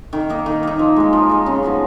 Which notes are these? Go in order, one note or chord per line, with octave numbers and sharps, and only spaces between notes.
D#3
A#3 D#4
D#3
A#3 D#4
F3
G#3 D#4
F3
G#3 D#4
C#3
F3 B3 F#4